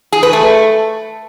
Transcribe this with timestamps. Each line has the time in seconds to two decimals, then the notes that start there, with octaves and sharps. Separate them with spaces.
0.12 G#4
0.23 B4
0.33 A3